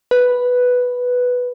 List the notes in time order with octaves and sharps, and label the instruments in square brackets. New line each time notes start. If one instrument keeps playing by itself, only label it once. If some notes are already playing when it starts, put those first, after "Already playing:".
[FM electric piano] B4